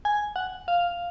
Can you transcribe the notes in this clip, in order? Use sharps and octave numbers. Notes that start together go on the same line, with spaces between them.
G#5
F#5
F5